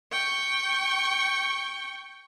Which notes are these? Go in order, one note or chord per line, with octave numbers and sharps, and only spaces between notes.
G5 C#6